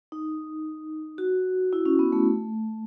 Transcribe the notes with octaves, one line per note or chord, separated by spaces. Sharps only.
D#4
F#4
E4
C#4
B3
A3